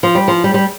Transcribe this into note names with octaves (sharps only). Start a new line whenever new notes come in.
F3
G3
F3
G3
G3